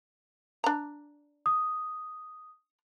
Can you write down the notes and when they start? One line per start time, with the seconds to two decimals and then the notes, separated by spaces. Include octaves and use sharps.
0.64 D4 A#5
1.46 D#6